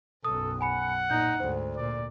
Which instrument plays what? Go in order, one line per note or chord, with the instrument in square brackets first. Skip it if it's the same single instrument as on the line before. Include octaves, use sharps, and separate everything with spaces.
[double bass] B1 F#2 [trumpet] A4 [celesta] D#6
[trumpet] F#5 [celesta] G#5 B5 C#7
[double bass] A#2 D#4 [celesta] G6
[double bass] D2 G#2 [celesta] C5
[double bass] A#2 [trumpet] D5